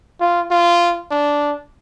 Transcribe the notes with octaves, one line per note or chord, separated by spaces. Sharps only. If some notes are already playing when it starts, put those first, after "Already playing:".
F4
F4
D4